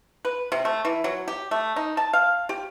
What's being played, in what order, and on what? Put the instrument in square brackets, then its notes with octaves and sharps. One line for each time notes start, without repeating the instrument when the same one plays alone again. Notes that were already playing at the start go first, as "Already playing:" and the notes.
[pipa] B4
C3
A3
E3
F#3
G4
A3
D#4
A5
F5
G4